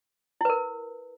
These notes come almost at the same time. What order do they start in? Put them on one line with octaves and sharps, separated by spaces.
E4 B4 A#4